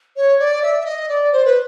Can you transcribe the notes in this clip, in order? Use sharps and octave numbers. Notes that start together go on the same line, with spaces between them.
C#5
D5
E5
E5
D#5
D5
C5
B4